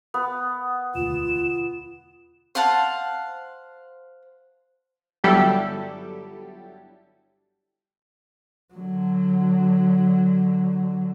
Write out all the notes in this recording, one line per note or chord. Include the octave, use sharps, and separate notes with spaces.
B3
E1 D2 F4 E7
C5 F5 F#5 A5
G1 F#3 G3 E4 G4 A4
D3 F#3